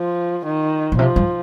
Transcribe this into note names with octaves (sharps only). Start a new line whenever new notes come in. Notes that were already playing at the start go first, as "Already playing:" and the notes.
Already playing: F3
D#3
A#2
C3 F3
G2